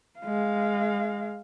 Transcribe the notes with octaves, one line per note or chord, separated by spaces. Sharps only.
G#3 F5